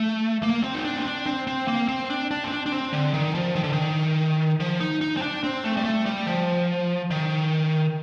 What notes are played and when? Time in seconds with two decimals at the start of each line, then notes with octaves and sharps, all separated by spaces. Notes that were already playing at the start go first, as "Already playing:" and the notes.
Already playing: A3
0.43 A#3
0.63 C4
0.74 D#4
0.85 D4
0.97 C4
1.06 D4
1.26 C4
1.47 C4
1.68 A#3
1.88 C4
2.10 D4
2.31 D4
2.44 C4
2.51 D4
2.66 D4
2.72 C4
2.93 D3
3.14 D#3
3.35 F3
3.56 D#3
3.64 D3
3.73 D#3
4.60 F3
4.80 D#4
5.01 D#4
5.17 C4
5.22 D4
5.44 C4
5.64 A3
5.77 G3
5.84 A3
6.06 G3
6.27 F3
7.11 D#3